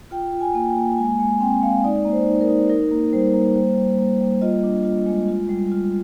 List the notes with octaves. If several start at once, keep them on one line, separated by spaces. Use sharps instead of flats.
F4 G5
F4
G#5
A#3
G5
A#3
G#3 G#5
G#3 G#5
C4 G5
G#3 F5
D#4 D5
A#3
C5
D#4
A#4
D#4
D#4 A#4
A#3
G3 C5
A#3
G3 C5
G3
A#3
G3
F4 D#5
D4
F4
G#3
F4
G3
F4